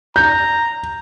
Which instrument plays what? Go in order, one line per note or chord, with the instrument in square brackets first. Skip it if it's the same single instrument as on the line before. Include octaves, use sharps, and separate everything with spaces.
[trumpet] A#5 [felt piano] G6